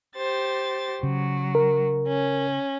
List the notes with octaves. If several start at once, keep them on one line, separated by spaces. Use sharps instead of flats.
G4 C5 A6
C#3 F#3
A#4
C#4